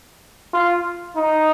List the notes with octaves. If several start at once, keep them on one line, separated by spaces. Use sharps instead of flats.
F4
D#4